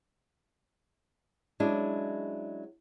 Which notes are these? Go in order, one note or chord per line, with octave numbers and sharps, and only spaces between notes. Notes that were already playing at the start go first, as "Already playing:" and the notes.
F#3 G#3 C#4 D4 E4